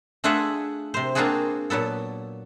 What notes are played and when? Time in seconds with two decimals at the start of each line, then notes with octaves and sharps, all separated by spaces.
0.24 A3 D4 F4 G#4 E5 F#5
0.94 C3 C5
1.15 A#3 C4 D4 F4 F#4 G#4
1.70 A#2 F#3 B3 A4